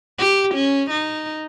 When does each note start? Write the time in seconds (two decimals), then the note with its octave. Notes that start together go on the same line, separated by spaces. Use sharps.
0.19 G4
0.54 C#4
0.90 D#4